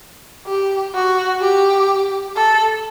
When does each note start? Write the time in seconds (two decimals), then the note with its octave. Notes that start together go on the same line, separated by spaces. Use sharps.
0.47 G4
0.94 F#4
1.41 G4
2.36 A4